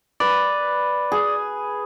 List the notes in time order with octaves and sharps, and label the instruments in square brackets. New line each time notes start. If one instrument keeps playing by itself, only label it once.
[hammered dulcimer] B4 [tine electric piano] D5
[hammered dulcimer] G#4